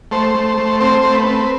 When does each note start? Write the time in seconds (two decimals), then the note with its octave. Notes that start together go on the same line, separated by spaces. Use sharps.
0.11 A3 C5
0.35 A3
0.58 A3
0.80 C4 C5
1.04 A3
1.15 B4
1.27 C4